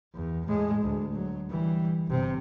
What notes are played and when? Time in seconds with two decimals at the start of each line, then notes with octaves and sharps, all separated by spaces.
0.15 E2
0.47 A2 G#3
0.83 D2
1.14 F#3
1.50 E3 G3
2.07 G1 C3